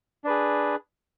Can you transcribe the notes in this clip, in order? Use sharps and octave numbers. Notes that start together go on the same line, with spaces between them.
D4 G#4 B4